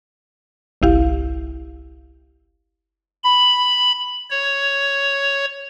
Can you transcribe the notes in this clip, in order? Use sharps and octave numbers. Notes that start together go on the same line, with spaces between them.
G1 C2 E4 G4 F5
B5
C#5